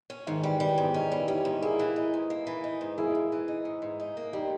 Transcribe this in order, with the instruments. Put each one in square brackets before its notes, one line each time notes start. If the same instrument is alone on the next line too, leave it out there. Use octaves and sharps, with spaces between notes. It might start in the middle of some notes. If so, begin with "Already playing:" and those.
[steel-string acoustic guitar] C#4
[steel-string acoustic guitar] G#2 [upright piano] D#3
[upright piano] E3 [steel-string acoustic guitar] G3
[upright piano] E3 [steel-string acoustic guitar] G3
[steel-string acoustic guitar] G#2 [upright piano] B3 D#4
[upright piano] B3 D#4 [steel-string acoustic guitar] C#4
[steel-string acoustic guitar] G3
[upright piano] E4
[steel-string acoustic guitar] C#4 [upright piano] D#4 G4
[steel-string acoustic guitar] G#2
[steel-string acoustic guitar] A#3 [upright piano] E4 G#4
[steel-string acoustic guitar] E3
D#4
G#2
A#3
E3
D#4
G#2
[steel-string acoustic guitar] A#3 [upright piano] E4 G#4
[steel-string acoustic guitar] G#2
E3
D#4
G#2
G#2
D#4
A#3
[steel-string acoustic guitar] G3 [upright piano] D#4 G4